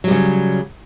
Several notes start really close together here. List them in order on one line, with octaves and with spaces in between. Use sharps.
F#3 G3 C#3